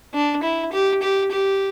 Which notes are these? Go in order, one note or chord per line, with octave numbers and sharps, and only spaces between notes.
D4
E4
G4
G4
G4